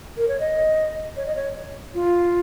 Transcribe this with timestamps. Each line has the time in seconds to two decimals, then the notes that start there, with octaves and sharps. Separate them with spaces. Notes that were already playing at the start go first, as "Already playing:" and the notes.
0.17 A#4
0.28 C#5
0.40 D#5
1.17 C#5
1.26 D#5
1.36 C#5
1.95 F4